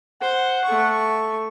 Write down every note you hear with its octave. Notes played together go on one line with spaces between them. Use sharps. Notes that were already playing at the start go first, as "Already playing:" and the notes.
C5 F#5
A3 C#6